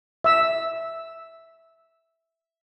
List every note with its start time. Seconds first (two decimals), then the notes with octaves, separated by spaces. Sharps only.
0.24 E5 E6